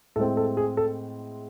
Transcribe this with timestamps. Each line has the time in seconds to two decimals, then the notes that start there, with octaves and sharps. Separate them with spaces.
0.16 A2 A4
0.19 G#3 C4
0.37 A4
0.57 G#4
0.77 A4